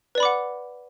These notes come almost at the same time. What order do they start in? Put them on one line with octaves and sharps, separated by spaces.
B4 D5 B5 D6 F#5